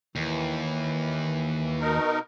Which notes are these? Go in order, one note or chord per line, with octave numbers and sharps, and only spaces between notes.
D#2 E3
B2 D#4 A#4